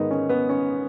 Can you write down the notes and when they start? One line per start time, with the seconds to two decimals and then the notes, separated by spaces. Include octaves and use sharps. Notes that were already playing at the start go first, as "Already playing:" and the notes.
Already playing: G#2 D#3 B3 D#4
0.11 C#4
0.29 B3
0.49 C#4